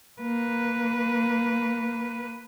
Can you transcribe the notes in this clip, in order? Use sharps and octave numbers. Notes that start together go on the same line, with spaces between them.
A#3 B4